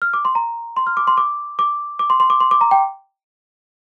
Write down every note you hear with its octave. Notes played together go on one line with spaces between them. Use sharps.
F6
D6
C6
A#5
C6
F6
D6
C6
D6
D6
D6
C6
C6
D6
C6
D6
A#5
G5